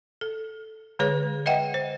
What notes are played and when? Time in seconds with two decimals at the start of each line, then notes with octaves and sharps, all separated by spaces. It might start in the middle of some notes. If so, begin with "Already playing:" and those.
0.21 A4
0.99 D3 G#3 G#4 B4 C#5
1.46 B4 D#5 E5 F#5 G5
1.74 C5